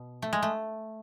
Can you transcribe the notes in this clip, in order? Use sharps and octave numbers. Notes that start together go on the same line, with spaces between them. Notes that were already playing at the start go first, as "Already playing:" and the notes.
Already playing: B2
A3
G#3
A3